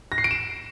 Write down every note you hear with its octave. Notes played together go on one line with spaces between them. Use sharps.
A#6
C7
D7
E7